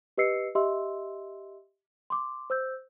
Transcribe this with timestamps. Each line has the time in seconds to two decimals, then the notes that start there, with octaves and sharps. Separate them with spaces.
0.18 G4 B4 D#5 E6 C7 C#7
0.55 G4 D#5 E5 C6 E6
2.10 C6 D6
2.50 C5 E6 G6